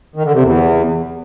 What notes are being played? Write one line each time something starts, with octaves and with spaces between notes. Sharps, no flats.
D#3
D3
C3
E2